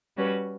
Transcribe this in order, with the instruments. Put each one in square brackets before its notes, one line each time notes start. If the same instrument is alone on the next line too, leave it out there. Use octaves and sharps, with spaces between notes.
[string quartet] G3 C#4 F#4 B4